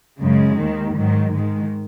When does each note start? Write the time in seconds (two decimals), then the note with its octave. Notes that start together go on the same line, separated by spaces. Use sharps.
0.20 F#2 C#3 G#3
0.58 D#2 D#3
0.95 G#2 D#3 F#3
1.33 G#2 D#3 G#3